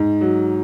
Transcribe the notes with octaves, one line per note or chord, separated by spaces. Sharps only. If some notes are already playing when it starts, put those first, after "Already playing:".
Already playing: G#2
F#3